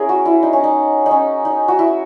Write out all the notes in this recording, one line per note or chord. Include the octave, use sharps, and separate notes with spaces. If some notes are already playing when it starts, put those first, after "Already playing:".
Already playing: C#4 E4 G#4 A#4
F#4
E4
D#4
C#4
D#4
D#4
C#4
D#4
F#4
E4